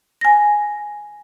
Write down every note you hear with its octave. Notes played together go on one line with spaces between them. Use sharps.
G#5 A#6